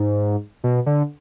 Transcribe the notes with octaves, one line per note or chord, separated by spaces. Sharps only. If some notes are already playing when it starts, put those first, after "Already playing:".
Already playing: G#2
B2
D3